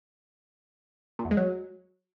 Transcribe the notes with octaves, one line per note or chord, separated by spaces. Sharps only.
A#2
E2
G#3
F#3